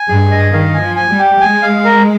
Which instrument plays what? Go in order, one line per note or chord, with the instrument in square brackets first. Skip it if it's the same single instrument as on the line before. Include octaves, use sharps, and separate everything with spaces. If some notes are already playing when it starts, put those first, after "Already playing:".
Already playing: [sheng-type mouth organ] G#5
[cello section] G2 [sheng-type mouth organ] G#4
[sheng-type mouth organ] D#5
[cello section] D#3 [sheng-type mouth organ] F5
[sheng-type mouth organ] G#5
[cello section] F3
[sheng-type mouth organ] G#5
[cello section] G3
[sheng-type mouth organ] G4
[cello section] G#3 [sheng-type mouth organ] G#5
[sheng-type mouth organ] F5
A#4